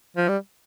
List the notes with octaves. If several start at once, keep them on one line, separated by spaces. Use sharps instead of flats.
F3
G3